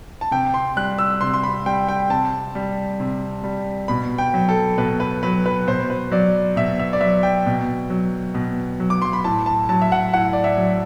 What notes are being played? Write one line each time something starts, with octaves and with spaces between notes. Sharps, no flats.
A5
C3 G5
C6
G3 F#6
E6
C3 C6
C6
B5
G3 G5
G5
C3 A5
G3
C3
G3
B2 B5
G5
F#3
A4
B2 B4
B4
F#3 B4
B4
B2 C5
B4
F#3 D5
B2 E5
E5
D5
F#3 E5
G5
B2
F#3
B2
F#3
D6
C6
B5
A2 A5
A5
F#3 A5
E5
F#5
A2 F#5
D5
E5
F#3